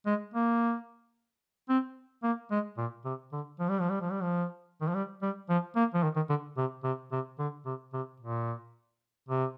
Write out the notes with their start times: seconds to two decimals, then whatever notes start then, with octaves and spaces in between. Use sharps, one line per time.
0.06 G#3
0.34 A#3
1.69 C4
2.23 A#3
2.51 G#3
2.78 A#2
3.05 C3
3.32 D3
3.59 F3
3.69 G3
3.81 F3
3.90 G3
4.01 F3
4.11 G3
4.22 F3
4.81 D#3
4.88 F3
4.95 G3
5.22 G3
5.49 F3
5.76 A#3
5.94 F3
6.03 D#3
6.16 D#3
6.30 D3
6.57 C3
6.84 C3
7.12 C3
7.39 D3
7.66 C3
7.93 C3
8.20 A#2
9.29 C3